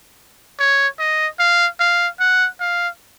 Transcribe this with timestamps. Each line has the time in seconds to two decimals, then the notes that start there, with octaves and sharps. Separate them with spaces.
0.59 C#5
0.99 D#5
1.39 F5
1.80 F5
2.20 F#5
2.60 F5